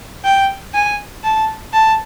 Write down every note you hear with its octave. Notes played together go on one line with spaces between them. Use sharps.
G5
G#5
A5
A5